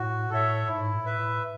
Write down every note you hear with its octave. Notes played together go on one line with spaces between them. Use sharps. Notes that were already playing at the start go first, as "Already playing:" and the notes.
Already playing: A2 F#4
A2 A4 C#5 E5
G#2 E4
A2
B4 E5
A2